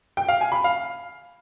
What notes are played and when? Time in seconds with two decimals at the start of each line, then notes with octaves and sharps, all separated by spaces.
0.17 G5
0.28 F5
0.41 G#5
0.52 B5
0.64 F5